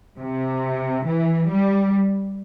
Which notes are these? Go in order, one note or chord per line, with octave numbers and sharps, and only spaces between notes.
C3
E3
G3